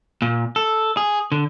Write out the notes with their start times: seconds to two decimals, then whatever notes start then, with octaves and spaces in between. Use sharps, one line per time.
0.22 A#2
0.56 A4
0.97 G#4
1.32 D3